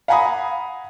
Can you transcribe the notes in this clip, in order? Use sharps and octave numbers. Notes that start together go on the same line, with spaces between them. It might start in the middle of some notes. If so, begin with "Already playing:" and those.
F5 F#5 G#5 A#5 B5 D#6